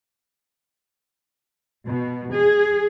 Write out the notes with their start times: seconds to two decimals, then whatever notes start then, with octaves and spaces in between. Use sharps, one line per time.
1.87 B2
2.34 G#4